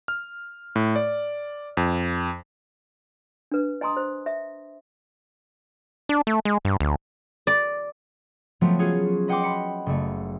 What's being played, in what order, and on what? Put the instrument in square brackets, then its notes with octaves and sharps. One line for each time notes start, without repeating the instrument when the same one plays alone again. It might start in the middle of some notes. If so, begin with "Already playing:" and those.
[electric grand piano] F6
A2
D5
F2
[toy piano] D4 B4
D#5 G#5 A#5 C6 D#6
C5
E5
[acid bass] D4
A3
G#3
G2
D2
[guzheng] D5
[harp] F3 F#3 A3 B3 C4
C#4 F4 F#4 G#4
B4 D#5 F#5 G5 C6 D6
B5 C#7
F#1 A3